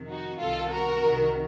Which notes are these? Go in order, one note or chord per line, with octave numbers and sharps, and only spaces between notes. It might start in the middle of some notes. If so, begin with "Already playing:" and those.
Already playing: F2 C3 D#3
D#4 F#4
C2 C3 D#3 F4 A4
F#4 A#4
C2 C3 D#3